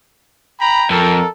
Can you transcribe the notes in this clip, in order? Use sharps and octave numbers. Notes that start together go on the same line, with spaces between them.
G5 A#5 B5
F2 A4 A#4